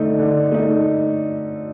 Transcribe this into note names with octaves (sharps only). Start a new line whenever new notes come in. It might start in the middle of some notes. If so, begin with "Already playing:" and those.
Already playing: D3 A3 D#4
D3
A3 D#4